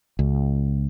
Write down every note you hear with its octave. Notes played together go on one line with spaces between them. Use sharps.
C#2